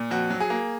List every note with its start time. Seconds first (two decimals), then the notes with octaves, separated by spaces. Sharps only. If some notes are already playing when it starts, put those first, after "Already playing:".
Already playing: A#2
0.11 F2 F#4
0.30 F#3
0.40 G#4
0.50 A#3